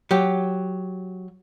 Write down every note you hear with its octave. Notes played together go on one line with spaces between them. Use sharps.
F#3 G4